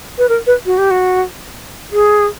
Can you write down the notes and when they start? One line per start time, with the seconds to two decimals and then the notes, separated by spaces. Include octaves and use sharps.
0.18 B4
0.29 A#4
0.47 B4
0.66 F#4
0.78 G4
0.91 F#4
1.92 G#4